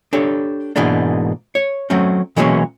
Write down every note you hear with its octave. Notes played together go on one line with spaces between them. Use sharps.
D4 G4 A4 C#5
G#2 B2 E3 G#3 A#3 D4
C#5
F#3 A3 C4 C#4
B2 E3 F#3 G#3 A#3 C#4